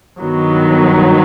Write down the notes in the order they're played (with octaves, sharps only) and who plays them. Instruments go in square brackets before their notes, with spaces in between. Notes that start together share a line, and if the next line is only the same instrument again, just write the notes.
[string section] G2 D#3 F#3 B3